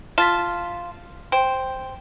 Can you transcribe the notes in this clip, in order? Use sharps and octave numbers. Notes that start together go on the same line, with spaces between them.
F4 A5 A6 B6
C5 G5